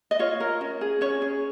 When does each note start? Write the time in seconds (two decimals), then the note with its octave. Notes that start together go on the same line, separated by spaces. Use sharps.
0.11 D#5
0.19 F4 C#5
0.40 A#4
0.61 C#4
0.81 G#4
1.01 C#4 C#5
1.22 G#4